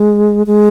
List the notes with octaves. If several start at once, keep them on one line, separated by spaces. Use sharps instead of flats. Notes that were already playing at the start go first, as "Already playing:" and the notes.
Already playing: G#3
G#3